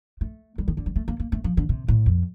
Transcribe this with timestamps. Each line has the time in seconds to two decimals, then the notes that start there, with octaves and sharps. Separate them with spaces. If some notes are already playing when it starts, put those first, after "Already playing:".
0.21 A3
0.58 G3
0.68 D#3
0.77 D3
0.86 G3
0.96 A3
1.08 A#3
1.20 A#3
1.32 A3
1.44 F3
1.57 D3
1.69 C3
1.88 A2
2.06 F2